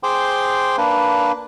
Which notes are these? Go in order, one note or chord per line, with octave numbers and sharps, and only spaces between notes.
G#4 C5 G5 C6 D6
A#3 D4 B4